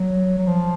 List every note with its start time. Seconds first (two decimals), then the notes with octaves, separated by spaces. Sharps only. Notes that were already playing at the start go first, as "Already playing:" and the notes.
Already playing: F#3
0.38 F#3
0.47 F3